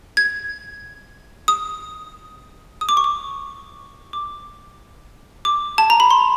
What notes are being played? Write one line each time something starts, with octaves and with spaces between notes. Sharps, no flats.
G#6
D#6
D#6
D6
C#6
D6
D6
D6
A5
A#5
B5
C6